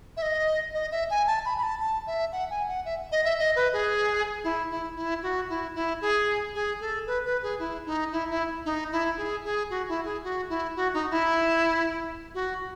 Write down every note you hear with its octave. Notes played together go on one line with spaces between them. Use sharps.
E5
D#5
D#5
E5
G#5
A5
B5
B5
A5
A5
E5
F#5
G#5
F#5
E5
D#5
E5
D#5
B4
G#4
E4
E4
E4
F#4
E4
E4
G#4
G#4
A4
B4
B4
G#4
E4
D#4
E4
E4
D#4
E4
G#4
G#4
F#4
E4
G#4
F#4
E4
F#4
D#4
E4
F#4